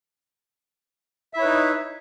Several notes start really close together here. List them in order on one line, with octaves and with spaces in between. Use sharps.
E5 E4 C#5 B4 D#4